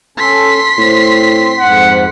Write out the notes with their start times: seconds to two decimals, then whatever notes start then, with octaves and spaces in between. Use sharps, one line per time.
0.18 C#4 A4 C6 B6
0.78 A2 C4
1.60 F2 G#2 F#5